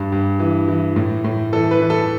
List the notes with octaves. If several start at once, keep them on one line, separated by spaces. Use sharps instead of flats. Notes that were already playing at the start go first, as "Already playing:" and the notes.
Already playing: G2
G2
E3
E3
A2
A2
E3 A4
B4
E3
A4